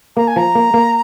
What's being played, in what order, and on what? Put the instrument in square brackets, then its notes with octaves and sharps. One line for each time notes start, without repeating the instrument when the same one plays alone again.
[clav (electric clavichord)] A#3 [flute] A#5
[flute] G#5
[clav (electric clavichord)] F3 [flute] A#5
[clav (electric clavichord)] A#3
A#3